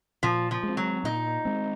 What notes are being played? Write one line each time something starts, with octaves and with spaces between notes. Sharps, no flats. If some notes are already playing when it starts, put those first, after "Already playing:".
A#2 F3
F3
G#3
C4
F#3
A#2 D#4
G#3 C4